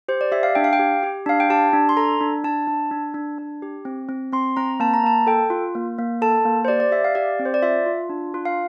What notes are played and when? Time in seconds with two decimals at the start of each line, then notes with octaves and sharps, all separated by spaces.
0.08 G4 C5
0.21 D5
0.32 G4 E5
0.43 F5
0.55 D4 G5
0.64 F5
0.73 G5
0.79 G4
1.03 G4
1.26 D4 F5
1.40 G5
1.50 G4 A5
1.73 D4
1.89 C6
1.97 A4 A#5
2.21 D4
2.44 D4 A5
2.67 D4
2.91 D4
3.14 D4
3.38 D4
3.62 G4
3.85 C4
4.09 C4
4.32 C4 C6
4.56 C4 A#5
4.80 A#3 A5
4.94 A#5
5.04 A#3 A5
5.27 A4 G5
5.50 F4
5.75 A#3
5.98 A#3
6.22 A4 A5
6.45 A#3
6.65 C5
6.68 G4 D5
6.80 D5
6.92 G4 E5
7.04 F5
7.15 G4 D5
7.39 C4
7.45 C5
7.54 D5
7.62 F4 E5
7.86 F4
8.09 D4
8.34 F4
8.45 F5